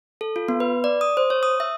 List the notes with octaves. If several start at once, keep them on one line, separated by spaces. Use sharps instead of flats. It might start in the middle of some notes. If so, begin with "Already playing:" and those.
A4
F4
B3
B4
D5
D#6
C5
C#5
D#6
E5